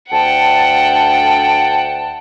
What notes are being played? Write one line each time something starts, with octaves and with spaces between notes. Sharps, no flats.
D2 F#5 G5 A5